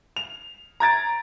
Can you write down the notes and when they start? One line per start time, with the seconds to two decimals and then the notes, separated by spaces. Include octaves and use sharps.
0.16 F7
0.80 A#5 G#6 A6 D7